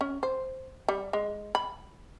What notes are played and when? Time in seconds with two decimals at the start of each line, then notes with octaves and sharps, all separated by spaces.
0.01 C#4
0.23 C5
0.88 G3
1.13 G#3
1.55 B5